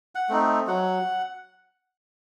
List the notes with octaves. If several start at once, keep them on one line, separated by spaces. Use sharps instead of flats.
F#5
A3 C4 D#4
F#3 F#5